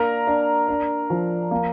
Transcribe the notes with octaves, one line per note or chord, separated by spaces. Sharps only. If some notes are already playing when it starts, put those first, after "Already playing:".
Already playing: A#3 D4 A#4 A#5
D4
D4
F3
A#3